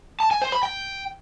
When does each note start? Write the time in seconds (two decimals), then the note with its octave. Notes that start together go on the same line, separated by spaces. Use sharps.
0.20 A5
0.31 G#5
0.42 C5
0.52 B5
0.63 G5